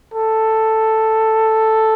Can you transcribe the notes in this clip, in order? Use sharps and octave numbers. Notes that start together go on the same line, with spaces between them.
A4